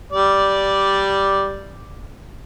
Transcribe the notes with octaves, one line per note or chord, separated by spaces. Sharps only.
G3 D5